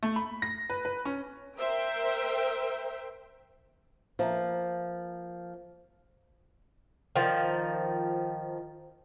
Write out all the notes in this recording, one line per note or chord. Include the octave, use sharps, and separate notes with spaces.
A3
B5
A#6
B4
B4
C#4
A#4 C5 E5 G5
F3 A#3
D#3 F3